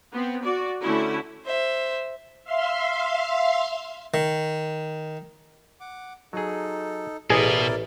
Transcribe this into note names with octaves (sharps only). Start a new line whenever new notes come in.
B3 C4
F#4 D5
D3 A3 C#4 E4 F#4
C5 E5
E5 F5 C6
D#3
F#5 D6
F#3 D#4 G#4 A4
A1 B2 E4 G#4 A#4 D5